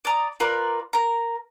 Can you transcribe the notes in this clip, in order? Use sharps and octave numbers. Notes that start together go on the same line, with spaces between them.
D5 A#5 D#6
F4 A#4 B4 D5
A#4 A#5